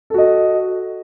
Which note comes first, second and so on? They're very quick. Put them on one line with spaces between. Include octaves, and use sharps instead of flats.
A4 F#4 D#5